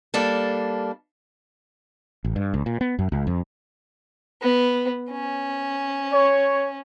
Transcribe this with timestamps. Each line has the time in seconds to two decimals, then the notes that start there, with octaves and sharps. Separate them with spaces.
0.14 G3 A#3 D4 A4
2.24 A1
2.36 G2
2.54 C#2
2.66 A#2
2.81 B3
2.99 F#2
3.12 C#2
3.27 F2
4.42 B3
5.11 C#4
6.13 C#5